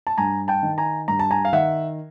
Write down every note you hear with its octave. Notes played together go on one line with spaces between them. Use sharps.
A5
G2 G#5 A#5
G5 A5
D#3
G#5 A#5
G2 A#5
A5
G#5 A#5
F5
D#3 E5 F#5